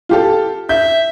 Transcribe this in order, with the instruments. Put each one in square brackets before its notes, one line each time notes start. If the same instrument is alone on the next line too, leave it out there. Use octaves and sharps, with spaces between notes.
[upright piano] F4 G4 A4
[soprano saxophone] E5 [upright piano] G6